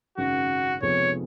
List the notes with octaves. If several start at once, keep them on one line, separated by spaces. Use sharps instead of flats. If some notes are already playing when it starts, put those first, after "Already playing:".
G#1 F#2 C#3 F#4
F1 F2 F3 G#3 B3 C#5